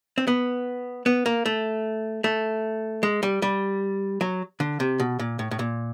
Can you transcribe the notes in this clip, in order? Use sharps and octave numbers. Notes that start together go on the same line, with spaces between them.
C4
B3
B3
A#3
A3
A3
G#3
G3
G3
F#3
D3
C3
B2
A#2
A2
A2
A#2